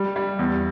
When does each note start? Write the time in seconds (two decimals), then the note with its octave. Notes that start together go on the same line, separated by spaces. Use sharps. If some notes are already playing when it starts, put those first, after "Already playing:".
Already playing: G3
0.16 G3
0.39 E2